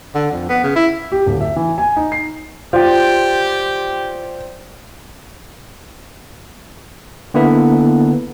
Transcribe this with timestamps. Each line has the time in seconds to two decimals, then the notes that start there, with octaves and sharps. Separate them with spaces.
0.15 D3
0.31 F2
0.49 B3
0.63 C#3
0.76 E4
1.12 G4
1.26 D1
1.41 E5
1.56 E3
1.78 G#5
1.96 D#4
2.12 C7
2.73 F4 G4 C5 D5 G5
7.34 D3 A#3 B3 E4 B4